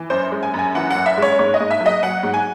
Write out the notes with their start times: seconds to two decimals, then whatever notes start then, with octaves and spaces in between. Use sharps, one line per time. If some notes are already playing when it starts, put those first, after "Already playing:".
Already playing: E3
0.10 F#2 C5
0.32 G#3
0.43 G#5
0.54 F#2
0.59 G#5
0.75 E3 F#5
0.90 F#5
0.96 F#2
1.06 E5
1.17 G#3 C#5
1.39 G#2 C#5
1.54 D#5
1.60 G#2
1.71 E5
1.80 F#3
1.86 D#5
2.03 F#3 F#5
2.23 G#2
2.34 G#5